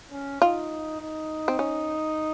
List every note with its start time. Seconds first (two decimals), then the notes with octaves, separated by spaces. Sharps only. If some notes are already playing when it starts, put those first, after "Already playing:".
0.12 C#4
0.41 D#4 F4
1.00 D#4
1.48 C4
1.59 C#4